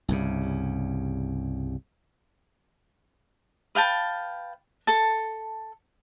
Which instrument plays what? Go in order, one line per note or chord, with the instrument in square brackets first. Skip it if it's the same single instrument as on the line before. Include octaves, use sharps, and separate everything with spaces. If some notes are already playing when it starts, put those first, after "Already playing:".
[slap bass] C2 G2 C#3
[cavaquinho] B4 F5 G5 A5
A4 A5